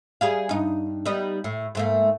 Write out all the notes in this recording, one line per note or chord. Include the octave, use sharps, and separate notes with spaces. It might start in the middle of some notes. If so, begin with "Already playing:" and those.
G3 G#4 F5
G2 D#4
G3 B3 D#4
A2
G#2 A3 A#3